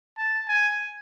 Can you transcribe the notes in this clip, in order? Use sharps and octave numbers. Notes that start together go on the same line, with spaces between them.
A5
G#5